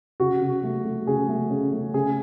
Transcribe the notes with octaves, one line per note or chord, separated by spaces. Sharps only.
C#3 F#4
C#3
A3
A3
C#3 G#4
A3
C#3
A3
C#3 G#4